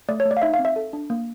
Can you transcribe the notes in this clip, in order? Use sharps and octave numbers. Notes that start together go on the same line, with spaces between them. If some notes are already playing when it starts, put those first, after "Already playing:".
A3 D5
C#5
A3
D5
F5
D#4 E5
F5
C4
E5
A4
D4
A#3